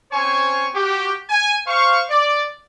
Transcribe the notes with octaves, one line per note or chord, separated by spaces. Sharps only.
C4 C#4 C5 C#5 G#5 C#6
F#4 G4
G#5
C5 F5 C#6
D5